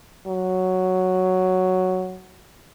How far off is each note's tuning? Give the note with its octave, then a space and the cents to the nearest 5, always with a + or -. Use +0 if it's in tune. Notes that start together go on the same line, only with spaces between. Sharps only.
F#3 +0